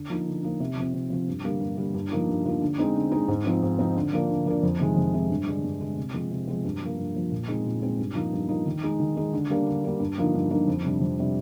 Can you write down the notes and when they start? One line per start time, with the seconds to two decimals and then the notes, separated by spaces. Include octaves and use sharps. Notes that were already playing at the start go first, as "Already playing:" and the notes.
Already playing: D3
0.10 F3 A#3 D#4
0.27 D3
0.43 F3 A#3 D#4
0.60 C3
0.77 F3 C4
0.93 C3
1.10 F3 C4
1.28 G2
1.44 D3 G3 A#3
1.60 G2
1.77 D3 G3 A#3
1.94 G2
2.11 F3 A#3 D#4
2.29 G2
2.45 F3 A#3 D#4
2.61 D3
2.78 G#3 C4 D#4
2.96 D3
3.12 G#3 C4 D#4
3.28 G#2
3.45 F3 C4 D#4
3.63 G#2
3.79 F3 C4 D#4
3.97 D3
4.13 F3 A#3 D4
4.30 D3
4.46 F3 A#3 D4
4.63 F2
4.80 C3 D#3 G#3
4.97 F2
5.14 C3 D#3 G#3
5.30 G2
5.46 D3 G#3 D4
5.64 G2
5.81 D3 G#3 D4
5.97 C3
6.14 F3 G#3 C4
6.31 C3
6.48 F3 G#3 C4
6.65 G2
6.81 F3 A#3
6.98 G2
7.14 F3 A#3
7.32 A#2
7.48 G#3 C4 D#4
7.66 A#2
7.82 G#3 C4 D#4
7.99 G2
8.15 F3 A#3 D#4
8.33 G2
8.49 F3 A#3 D#4
8.66 D#3
8.83 G#3 D#4
9.00 D#3
9.17 G#3 D#4
9.33 D3
9.50 G3 A#3 D4
9.66 D3
9.84 G3 A#3 D4
10.00 G2
10.18 D3 F3 A#3 D#4
10.34 G2
10.50 D3 F3 A#3 D#4
10.68 F2
10.85 C3 G3 D4
11.01 F2
11.18 C3 G3 D4